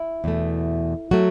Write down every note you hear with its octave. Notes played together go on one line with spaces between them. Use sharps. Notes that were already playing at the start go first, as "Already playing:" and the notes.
Already playing: E4
E2 B2 A3
F#3 A3 F#4